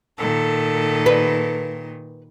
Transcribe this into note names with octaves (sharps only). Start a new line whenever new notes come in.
A#2 D#3 A4
B4